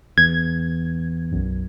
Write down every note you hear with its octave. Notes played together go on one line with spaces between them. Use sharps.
E2 G#6
B1 F#2